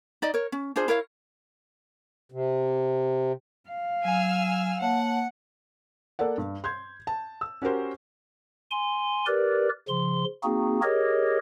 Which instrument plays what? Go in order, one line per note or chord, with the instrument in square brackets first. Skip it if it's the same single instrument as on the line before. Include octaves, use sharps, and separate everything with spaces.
[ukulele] D#4 D5 D#5
A#4 C#5
C#4
D4 F4 G#4 C5
E4 A#4 C#5 F5
[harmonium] C3
[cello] F5
[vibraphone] F#3 [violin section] G#5 E6 F6
[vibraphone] A#3 C#5 A5 [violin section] F#5
[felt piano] A#3 A4 A#4 D5 F#5
G2
C6 G6 G#6
A5
E6
C#4 F#4 G4 A#4 C5
[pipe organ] G#5 C6
G4 A#4 B4 D5
C#3 F3 C6
A#3 C4 D#4 F#4 G#4
G4 G#4 A#4 C#5 D#5